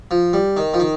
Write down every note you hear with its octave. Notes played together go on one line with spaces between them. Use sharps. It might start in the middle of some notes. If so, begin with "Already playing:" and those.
F3
G3
D#3
F3
D#3